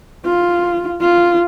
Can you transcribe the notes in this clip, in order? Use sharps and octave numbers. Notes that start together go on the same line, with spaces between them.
F4
F4